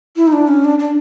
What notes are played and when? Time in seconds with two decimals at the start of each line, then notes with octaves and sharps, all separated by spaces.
0.17 E4
0.27 D#4
0.33 D4
0.48 C#4
0.64 D4
0.79 D4